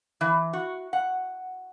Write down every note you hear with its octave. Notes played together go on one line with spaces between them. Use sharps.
E3
F#4
F#5